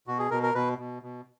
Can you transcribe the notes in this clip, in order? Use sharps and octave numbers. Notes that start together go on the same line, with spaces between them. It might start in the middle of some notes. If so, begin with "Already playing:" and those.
B2 F#4
G#4
B2 A#4
A#4
B2 B4
B2
B2